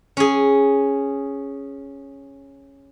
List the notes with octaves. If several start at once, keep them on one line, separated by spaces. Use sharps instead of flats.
C#4 G#4